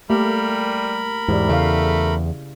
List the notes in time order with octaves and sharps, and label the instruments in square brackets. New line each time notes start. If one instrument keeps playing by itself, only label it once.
[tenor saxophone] G3 [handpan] A3 A#3 G4 [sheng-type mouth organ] A#4 B5
[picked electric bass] E2 G#2 [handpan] E4 G4 D5
[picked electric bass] E2 [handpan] C#3 F5 [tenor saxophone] A3